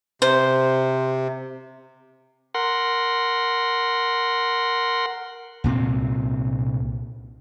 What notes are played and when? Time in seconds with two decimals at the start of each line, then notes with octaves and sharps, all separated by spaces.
0.22 C3 C5
2.55 A#4 F#5 C6
5.64 C2 A#2 G#3 C4